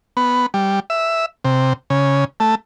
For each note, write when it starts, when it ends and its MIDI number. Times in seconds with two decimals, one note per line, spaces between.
0.17 0.46 59
0.54 0.80 55
0.90 1.26 76
1.45 1.73 48
1.90 2.24 49
2.40 2.55 57